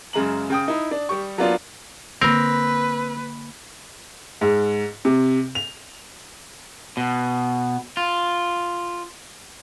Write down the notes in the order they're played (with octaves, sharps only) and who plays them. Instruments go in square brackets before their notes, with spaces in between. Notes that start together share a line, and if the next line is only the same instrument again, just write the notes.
[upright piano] F#2 C#3 G#3 A#5 F#7
C#3 G5 D#6
D#4 E4
D4
G3 G4 C#6
F#3 A#3 B3 D4 F4
[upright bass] D3 A#3 [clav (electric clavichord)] C4 A#4 [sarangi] B4
[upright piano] G#2
C3
F7
[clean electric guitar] B2
F4